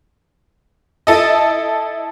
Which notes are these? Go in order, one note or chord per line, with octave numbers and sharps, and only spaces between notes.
E4 A4 D#5